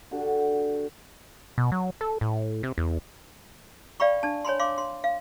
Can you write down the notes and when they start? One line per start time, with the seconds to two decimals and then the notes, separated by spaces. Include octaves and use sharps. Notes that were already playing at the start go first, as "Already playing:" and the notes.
0.11 D3 F#4 G4
1.58 B2
1.72 F#3
2.01 A4
2.21 A2
2.63 C3
2.78 E2
4.00 D5 F5 G5 B5 C#6
4.23 D4 A5
4.45 C#5 G#5 B5 C6
4.59 F5 C6 D6
4.78 C6
5.04 F5